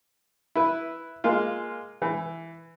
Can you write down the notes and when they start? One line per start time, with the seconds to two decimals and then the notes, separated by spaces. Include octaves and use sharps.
0.55 E4 B4
1.24 G#3 A#3 F4
2.02 E3